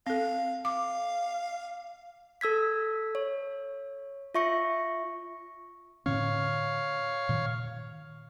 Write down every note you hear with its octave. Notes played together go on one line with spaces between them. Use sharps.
C4 A4 F5
F5 D6
A4 E6 G#6 B6
C#5
F4 E5 C#6 A#6 C#7
A2 D3 C#4 C#5 F5
A#2 D#3